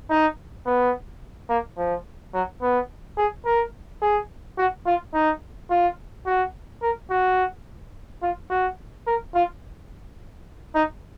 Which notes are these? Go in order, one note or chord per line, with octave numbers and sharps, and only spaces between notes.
D#4
B3
A#3
F3
F#3
B3
G#4
A#4
G#4
F#4
F4
D#4
F4
F#4
A#4
F#4
F4
F#4
A#4
F4
D#4